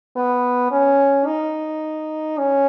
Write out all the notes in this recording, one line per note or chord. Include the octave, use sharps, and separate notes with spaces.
B3
C#4
D#4
C#4